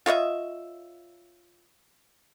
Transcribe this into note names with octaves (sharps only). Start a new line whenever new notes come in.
F4 C#5 D#5 E5